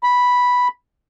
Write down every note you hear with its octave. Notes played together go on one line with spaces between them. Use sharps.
B5